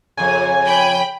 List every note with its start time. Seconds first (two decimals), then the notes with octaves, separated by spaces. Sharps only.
0.17 F2 C#3 G#5
0.65 G5 B5